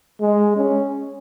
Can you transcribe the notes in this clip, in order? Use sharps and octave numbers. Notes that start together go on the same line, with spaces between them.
G#3
C#4